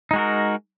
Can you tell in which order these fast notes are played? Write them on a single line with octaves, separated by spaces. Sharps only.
D#4 G#3 F#4 A#4